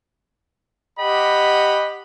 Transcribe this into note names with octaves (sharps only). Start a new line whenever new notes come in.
G4 D#5 F#5 B5